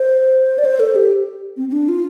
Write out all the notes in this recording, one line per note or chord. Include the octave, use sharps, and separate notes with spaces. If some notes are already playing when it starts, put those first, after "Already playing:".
Already playing: C5
D5
C5
A4
G4
C4
C4
D4
F4